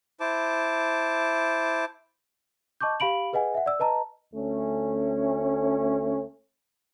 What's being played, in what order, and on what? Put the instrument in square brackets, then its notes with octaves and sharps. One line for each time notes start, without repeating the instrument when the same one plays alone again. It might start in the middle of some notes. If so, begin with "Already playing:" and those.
[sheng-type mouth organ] E4 C5 A5 D6
[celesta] D#5 A5 C#6 D6 G6
G4 F5 B5 D7 F#7
G#4 B4 D#5 F#5 G#5
E5 F#5
D5 E6
B4 D#5 A5 A#5
[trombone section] D2 A3 C#4